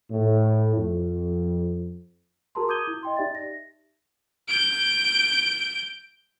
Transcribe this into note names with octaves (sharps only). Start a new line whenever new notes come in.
A2
F2
F#4 G#4 A#4 A5 A#5 C6
D6 D#6 G6 G#6 D#7 G7
E4
D#5 G5 C6
D#4 G4 D5 E5 A6
A#6
G6 D7